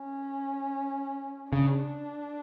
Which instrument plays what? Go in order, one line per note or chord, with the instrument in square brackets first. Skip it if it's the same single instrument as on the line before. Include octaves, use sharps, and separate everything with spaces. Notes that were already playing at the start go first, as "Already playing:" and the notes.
Already playing: [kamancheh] C#4
[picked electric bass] C#3 [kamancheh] D4